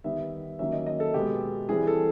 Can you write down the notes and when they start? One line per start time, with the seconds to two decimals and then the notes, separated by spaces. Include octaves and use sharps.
0.04 D#3 G3 B3 E5
0.59 D#3 F#3 A#3 C#4 E5
0.72 D#5
0.86 D#5
1.00 A4
1.14 B2 G#3 B3 G4
1.69 E3 G3 C4 G#4
1.87 A4